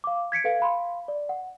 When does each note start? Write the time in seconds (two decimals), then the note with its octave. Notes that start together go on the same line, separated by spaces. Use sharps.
0.04 F5 D6
0.32 G#6 B6 C#7 D7
0.44 A4 B4 F5
0.60 F5 B5 C6
1.08 D5
1.29 F#5